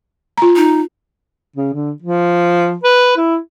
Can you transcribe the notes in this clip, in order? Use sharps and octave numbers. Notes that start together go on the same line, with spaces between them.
F4 A#5
D#4
C#3
D3
F3
B4
E4